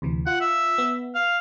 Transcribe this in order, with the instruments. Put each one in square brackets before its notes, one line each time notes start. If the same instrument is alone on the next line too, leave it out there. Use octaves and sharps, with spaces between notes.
[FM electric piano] D2 C3 E3
[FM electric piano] F4 [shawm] F#5
[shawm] E5
[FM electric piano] B3
[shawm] F5